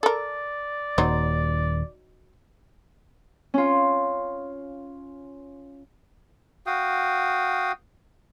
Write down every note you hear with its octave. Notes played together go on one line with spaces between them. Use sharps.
A4 A#4 D5
D#1 F#3 D#4 C5
C#4 F4
F#4 F5 G5 D#6